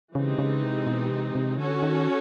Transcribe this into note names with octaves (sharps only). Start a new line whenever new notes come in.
C#3 E3 G#3 C4 D#4 G4
C#3
C3
B2
C3
C3
D3 C#4 F#4 A4 C#5
D#3